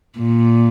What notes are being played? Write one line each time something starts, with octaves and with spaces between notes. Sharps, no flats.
A#2